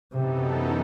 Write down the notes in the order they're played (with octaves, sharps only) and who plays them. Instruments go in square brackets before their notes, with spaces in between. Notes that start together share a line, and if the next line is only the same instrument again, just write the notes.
[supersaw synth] F#2 E3 B3 D#4 A4 [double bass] C3